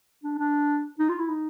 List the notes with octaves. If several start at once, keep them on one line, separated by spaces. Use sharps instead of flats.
D4
D4
D#4
F4
E4
D#4